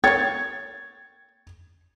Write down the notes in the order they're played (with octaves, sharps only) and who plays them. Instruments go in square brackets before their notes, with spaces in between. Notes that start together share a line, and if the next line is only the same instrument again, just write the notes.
[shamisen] A#3 G5 [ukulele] C#5 [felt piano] G#6 A6